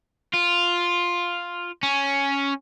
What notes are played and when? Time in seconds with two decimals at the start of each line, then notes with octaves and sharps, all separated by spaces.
0.33 F4
1.83 C#4